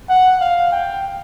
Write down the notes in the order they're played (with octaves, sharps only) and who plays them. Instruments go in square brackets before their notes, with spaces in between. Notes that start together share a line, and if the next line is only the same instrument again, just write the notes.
[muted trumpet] F#5
F5
G5